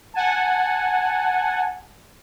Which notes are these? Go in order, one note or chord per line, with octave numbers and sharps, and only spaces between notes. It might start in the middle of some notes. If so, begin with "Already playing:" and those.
F#5 G#5 A5